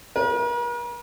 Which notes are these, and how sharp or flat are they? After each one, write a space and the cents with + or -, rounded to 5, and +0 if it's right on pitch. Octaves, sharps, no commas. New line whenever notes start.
A#4 +45